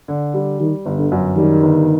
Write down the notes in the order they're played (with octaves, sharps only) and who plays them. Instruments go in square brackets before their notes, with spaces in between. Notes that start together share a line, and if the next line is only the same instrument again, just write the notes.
[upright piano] D3
G3
[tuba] D#3 [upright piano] G3
[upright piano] G1
[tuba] D3
[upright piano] F#2
[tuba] D#3 [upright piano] G3
[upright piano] G1